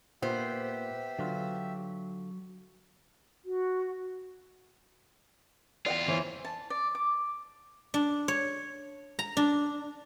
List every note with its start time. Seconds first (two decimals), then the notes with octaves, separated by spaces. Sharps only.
0.22 A#2 B3 G4 C5 E5
1.19 D3 F#3 F4
3.44 F#4
5.86 E2 F4 D5 F#5 G5
6.08 E3 C5 C#5
6.45 A5
6.70 D5
6.95 D6
7.94 D4
8.28 C#5
9.19 A#5
9.37 D4